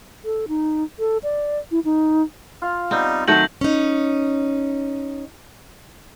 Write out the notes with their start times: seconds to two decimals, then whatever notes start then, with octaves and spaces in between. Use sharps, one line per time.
0.25 A4
0.48 D#4
0.99 A4
1.23 D5
1.71 E4
1.85 D#4
2.62 F4 F5
2.91 G3 B3 C4 D#4
3.28 D#3 F#3 A3 F#5 G6 A#6 F#7
3.61 C#4 D#4